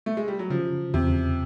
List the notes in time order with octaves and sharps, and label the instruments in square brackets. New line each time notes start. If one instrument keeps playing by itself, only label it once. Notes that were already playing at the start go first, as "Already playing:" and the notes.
[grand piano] A3
G#3
G3
F#3
[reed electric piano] C#3 [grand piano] F3
[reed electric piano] E2 [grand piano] C3